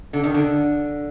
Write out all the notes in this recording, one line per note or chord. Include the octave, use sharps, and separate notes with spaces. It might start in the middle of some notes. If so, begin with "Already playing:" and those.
D3
D#3
D3